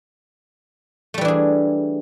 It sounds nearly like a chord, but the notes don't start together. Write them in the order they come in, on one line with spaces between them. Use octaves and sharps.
A3 G3 E3 D4 G#4